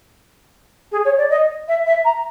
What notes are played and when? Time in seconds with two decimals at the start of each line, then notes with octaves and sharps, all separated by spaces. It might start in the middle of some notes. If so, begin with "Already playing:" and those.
0.92 G#4
1.05 C#5
1.18 D5
1.30 D#5
1.68 E5
1.86 E5
2.05 A#5